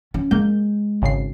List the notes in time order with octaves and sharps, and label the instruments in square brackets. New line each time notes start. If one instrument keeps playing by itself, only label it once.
[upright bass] C#4
[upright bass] G#3 [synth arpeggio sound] A#3 G6
[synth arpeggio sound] G#1 C#3 C7